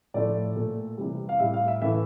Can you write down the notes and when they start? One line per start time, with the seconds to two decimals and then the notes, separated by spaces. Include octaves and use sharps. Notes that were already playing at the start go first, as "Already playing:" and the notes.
0.14 A2 F3 A3 D5
0.56 A#2 A3
0.97 C3 E3 G3
1.29 F5
1.39 A2 G3 E5
1.54 F5
1.68 E5
1.82 A2 E3 A3 E5